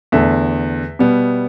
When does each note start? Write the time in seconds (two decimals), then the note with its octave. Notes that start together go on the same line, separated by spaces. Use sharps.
0.12 E2 D3 A3 E5
0.99 B2 G3 B3